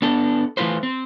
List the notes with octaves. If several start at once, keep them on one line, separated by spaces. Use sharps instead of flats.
B3 D4 A4
E3 A3 E4 F4 B4 C5
C4